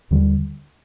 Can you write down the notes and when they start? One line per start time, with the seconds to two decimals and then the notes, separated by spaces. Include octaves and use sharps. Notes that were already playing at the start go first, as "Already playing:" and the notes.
0.11 D#2 D3 G3